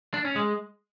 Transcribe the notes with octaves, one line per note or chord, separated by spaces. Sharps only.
D4
C#4
G#3